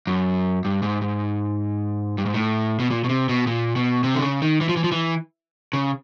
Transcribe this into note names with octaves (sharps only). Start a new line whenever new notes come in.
F#2
G2
G#2
G#2
G2
G#2
A2
B2
A#2
B2
C3
B2
A#2
B2
C3
D3
C#3
D#3
E3
F3
E3
F3
E3
C#3